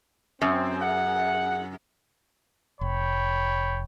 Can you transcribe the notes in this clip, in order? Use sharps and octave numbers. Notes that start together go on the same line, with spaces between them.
F#2 C4
G#4 F#5
F1 C#5 G5 B5